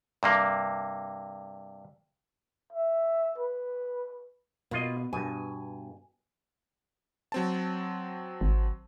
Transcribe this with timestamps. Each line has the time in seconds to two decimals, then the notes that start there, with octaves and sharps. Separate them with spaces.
0.23 G2 C3 A#3
2.73 E5
3.38 B4
4.71 B2 A#3 F4 D#5
5.13 G2 B2 G#5
7.32 F#3 C4 A5
8.41 G#1